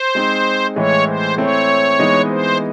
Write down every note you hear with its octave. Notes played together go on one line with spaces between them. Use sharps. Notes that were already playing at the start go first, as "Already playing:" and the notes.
Already playing: C5
G#3 C4 D#4
A2 E3 G#3 C#5
C5
A3 C4 E4 C#5
E3 G#3 B3 D#4
C5